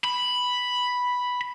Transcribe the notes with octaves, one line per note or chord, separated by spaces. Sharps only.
B5